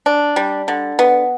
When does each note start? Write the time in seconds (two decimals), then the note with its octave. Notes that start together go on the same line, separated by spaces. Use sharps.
0.06 D4
0.36 G3
0.68 D3
0.99 B3